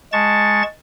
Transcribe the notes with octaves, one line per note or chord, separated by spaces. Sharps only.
G#3 A5 C#6 A6